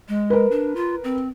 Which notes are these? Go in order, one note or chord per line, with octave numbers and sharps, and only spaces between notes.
G#3
A#4 B4
D4
F4
C4